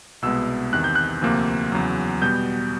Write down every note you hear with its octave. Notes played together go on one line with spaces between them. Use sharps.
C2 B2 G#3 B3 E6
E2 C3 D#3 F#6
G6
F#6
D2 C3 F3 A#3
E2 C#3 F#3
B2 G3 B3 G6